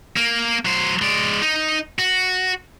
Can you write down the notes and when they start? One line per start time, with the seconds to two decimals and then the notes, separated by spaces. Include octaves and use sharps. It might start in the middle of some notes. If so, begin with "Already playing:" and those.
0.17 A#3
0.65 F#3 C5
1.02 G#3 D5
1.42 D#4
1.99 F#4